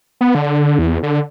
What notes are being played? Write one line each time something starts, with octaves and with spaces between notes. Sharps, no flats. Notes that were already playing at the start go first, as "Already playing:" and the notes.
B3
D3
E2
D3